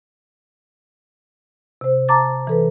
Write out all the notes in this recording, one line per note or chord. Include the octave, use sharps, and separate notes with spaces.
C3 C5
A5 A#5 D6 A6
E3 A4 B4